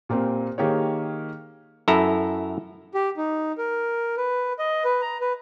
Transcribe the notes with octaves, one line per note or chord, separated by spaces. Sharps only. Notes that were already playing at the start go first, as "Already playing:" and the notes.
A#2 A#3 C4 G4
D#3 A#3 G4 G#4 C#5
F#2 E4 A4 A#5
G4
D#4
A#4
B4
D#5
B4
A#5
B4